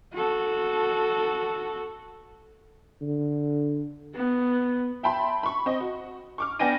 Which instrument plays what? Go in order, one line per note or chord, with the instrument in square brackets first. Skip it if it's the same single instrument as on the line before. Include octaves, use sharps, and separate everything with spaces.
[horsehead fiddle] F#4 A4
[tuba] D3
[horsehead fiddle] B3
[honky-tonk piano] E5 G5 A5 B5 C6
B5 C#6
C4 D#5
F#4
C#6 D6 F6
B3 D4 G5 G#5 A#6 D#7